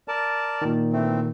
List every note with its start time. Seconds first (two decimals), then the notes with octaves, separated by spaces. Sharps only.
0.08 A#4 D5 A5
0.62 A#2 D#3
0.92 E3 A3 C4